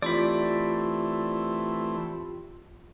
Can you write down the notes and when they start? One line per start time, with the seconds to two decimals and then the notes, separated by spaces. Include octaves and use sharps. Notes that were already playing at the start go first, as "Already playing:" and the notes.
0.02 E3 A3 C4 F4 G4 D5 B5